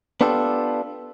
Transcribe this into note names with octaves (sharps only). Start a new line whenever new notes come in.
B3 D4 F4 G4 A4